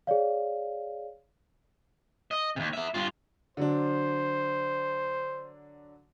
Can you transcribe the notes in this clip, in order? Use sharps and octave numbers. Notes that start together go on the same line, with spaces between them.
G#4 C#5 D5 F5
D#5
D#2 C3
B3 E5
G2 F4
D3 F#3 D4 C5